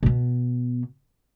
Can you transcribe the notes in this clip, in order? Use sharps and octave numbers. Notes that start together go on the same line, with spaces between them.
B2 B3